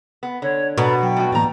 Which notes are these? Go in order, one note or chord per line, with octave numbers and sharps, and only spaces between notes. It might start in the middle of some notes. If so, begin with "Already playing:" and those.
B3
D3 C#5
B2 A4 D5 A#5 B5
F#3 G5
A2 F#4
A2 E3 G3 A#3 A#5